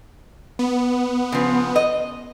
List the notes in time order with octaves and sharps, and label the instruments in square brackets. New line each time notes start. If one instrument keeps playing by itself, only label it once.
[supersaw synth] B3
[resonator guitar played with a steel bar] C#3 F3
D#5